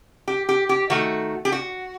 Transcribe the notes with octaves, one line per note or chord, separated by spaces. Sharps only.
G4
G4
G4
D#3 A3 F#4
G4
F#4